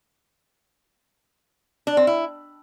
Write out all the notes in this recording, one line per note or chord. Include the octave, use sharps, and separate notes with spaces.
D4
C4
E4